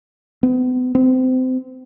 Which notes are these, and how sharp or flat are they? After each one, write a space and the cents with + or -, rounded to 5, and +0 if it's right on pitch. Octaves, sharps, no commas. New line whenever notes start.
B3 +40
C4 -30